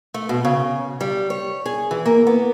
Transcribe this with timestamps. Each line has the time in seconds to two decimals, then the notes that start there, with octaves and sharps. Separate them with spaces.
0.14 A3
0.29 B2
0.45 C#3
1.01 G3
1.30 C#5
1.66 G#4
1.91 E3
2.06 A#3
2.27 B3